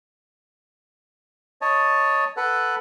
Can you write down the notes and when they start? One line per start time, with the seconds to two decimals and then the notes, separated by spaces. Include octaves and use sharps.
1.61 C#5 D#5 A5
2.37 A4 B4 F#5